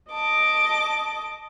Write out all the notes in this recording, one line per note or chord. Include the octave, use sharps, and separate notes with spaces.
D#5 A5 D6